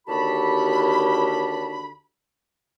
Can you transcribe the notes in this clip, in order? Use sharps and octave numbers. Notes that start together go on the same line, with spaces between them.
D#2 D3 F#4 G4 A5 B5